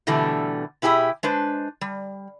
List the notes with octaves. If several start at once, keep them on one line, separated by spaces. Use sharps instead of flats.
B2 D3 E3 G3 A3
B2 E4 G4 G#4 E5
G#3 D4 B4 C5
G3